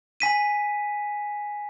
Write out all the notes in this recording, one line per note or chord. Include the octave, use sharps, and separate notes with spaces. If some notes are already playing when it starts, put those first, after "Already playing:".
G#5 B6 D#7